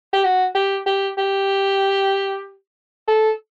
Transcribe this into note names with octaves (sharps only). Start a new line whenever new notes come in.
G4
F#4
G4
G4
G4
A4